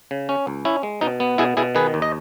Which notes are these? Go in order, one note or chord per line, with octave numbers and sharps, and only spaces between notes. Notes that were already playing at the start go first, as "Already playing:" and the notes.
C#3
C#4
C#2
C#4 E4
G#3
B2 D#4
B3
B2 E4 G#4
B2 E4 G#4
D#3 G#4 B4
D#2
D#5